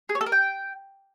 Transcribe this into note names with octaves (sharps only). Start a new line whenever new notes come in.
G#4
C#5
A4
A#4
G5